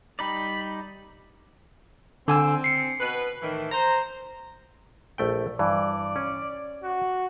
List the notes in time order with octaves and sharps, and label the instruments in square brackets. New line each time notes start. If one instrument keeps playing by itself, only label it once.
[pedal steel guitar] G3 D#4 D5 [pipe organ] B5
[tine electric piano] D3 G#5 E6 [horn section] C4
[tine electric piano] C7 C#7
[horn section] B2 B4
A2 D#3 E3
C5 A#5
[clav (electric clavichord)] A#1 A3 G5
[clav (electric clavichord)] G2 E3 [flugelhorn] D5
[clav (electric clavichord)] C#4
[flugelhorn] F#4